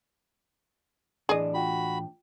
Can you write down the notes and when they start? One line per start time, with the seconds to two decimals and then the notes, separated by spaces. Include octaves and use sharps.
1.29 A2 E3 D4 G#4 D5 D#5 D6
1.54 F4 F#4 G5 B5